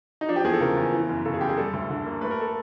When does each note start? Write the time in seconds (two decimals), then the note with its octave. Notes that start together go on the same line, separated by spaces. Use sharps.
0.21 D#4
0.28 F3 D4
0.36 G4
0.44 E2 G#4
0.53 A4
0.61 C#3 A#4
0.77 E2
0.93 E3
1.09 F#2
1.25 C#3 A4
1.34 G#4
1.41 F#2 G4
1.49 G#4
1.57 G3 A4
1.73 D2
1.90 D3
2.05 A#3
2.21 A3 B4
2.31 A#4
2.41 A4